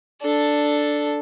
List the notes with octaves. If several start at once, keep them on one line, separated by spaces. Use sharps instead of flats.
D4 A4